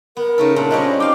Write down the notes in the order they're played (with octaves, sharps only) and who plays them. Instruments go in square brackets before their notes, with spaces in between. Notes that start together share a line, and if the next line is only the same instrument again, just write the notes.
[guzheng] B3 [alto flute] A#4
[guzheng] C#3 A3 A4 [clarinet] D#4
[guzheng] A#2 [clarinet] D4
[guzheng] G3 C4 C#4 [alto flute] D#5
[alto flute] D#4 [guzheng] F5 G5 [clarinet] D6